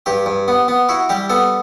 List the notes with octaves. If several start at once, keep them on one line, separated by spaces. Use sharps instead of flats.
G2 G4
G2
B3
B3
E4 F#4
G3 G4
B3 A4